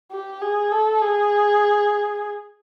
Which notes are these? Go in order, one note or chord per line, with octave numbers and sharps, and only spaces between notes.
G4
G#4
A4
G#4